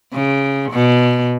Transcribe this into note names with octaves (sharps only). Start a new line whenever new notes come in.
C#3
B2